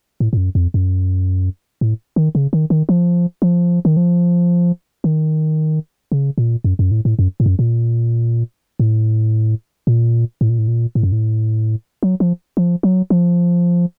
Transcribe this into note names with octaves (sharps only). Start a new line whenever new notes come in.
A2
A2
F#2
F2
F#2
A2
D#3
C#3
D#3
D#3
F3
F3
D#3
F3
D#3
C#3
A#2
F#2
F#2
A2
A2
F#2
A2
F#2
A#2
A2
A#2
A2
A#2
A2
A#2
A2
F#2
A2
F#3
F3
F3
F#3
F3